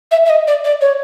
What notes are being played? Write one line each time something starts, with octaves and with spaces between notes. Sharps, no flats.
E5
E5
D#5
D5
D5
C#5